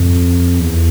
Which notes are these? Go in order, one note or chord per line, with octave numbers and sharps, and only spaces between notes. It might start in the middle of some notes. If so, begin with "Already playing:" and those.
Already playing: F2
E2